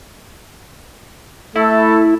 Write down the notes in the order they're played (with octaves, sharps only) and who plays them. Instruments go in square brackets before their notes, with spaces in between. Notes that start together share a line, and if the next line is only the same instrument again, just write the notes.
[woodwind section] A3 A4 [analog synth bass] E4